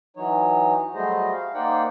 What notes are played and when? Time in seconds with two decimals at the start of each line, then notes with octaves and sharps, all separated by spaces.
0.17 E3 F#3 D#4 C#5
0.94 F#3 G3 A3 G#4 C5 D#5
1.32 F5
1.54 A#3 D#4 C5 D5 F#5 G5